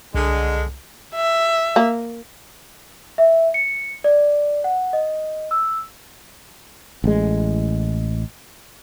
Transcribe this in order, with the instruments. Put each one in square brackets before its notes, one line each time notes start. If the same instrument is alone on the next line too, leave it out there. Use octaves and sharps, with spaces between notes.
[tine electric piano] C2 [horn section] D3 G#3
[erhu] E5
[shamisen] A#3
[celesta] E5
C#7
D5
F#5
D#5
E6
[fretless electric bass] A1 G#3